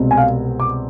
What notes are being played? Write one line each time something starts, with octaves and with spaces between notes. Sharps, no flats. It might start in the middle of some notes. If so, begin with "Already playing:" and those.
Already playing: C2 B2 G#3 C4
G#5
F5
D6